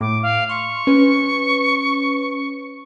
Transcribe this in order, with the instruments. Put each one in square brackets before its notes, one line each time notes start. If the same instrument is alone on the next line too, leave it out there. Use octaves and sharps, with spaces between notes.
[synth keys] A2 [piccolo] D6
[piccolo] F5
[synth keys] C6 [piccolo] C#6
[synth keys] C#4 B4